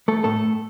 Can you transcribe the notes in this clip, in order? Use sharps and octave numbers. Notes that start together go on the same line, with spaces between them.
A3 A4
A2 A3 A4